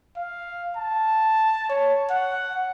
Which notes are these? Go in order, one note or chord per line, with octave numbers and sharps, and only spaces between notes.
F5
A5
C#5
F#5